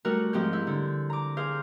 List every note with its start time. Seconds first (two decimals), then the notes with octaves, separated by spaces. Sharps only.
0.05 G3 A3 F#4 A#4 F#5
0.33 G#2 F3 C4 G4 G6
0.53 E4
0.67 D3
1.10 A#5 D6
1.37 G#4 C5 F5